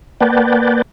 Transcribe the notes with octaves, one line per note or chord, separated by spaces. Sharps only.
A#3 B4 D5 F#5 G5 A5